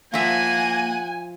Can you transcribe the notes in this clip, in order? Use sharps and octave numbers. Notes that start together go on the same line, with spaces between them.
F3 A#3 E5 F#5 G#5 D#7